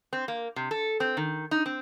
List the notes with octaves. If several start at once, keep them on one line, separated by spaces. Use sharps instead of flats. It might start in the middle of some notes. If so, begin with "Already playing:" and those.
C4
A#3
C3
A4
C4
D#3
D#4
C4